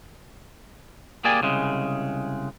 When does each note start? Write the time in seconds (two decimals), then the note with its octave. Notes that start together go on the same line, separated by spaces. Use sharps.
1.25 A#3 G4 G#4 D5 G#5
1.41 C2 C#3 G#3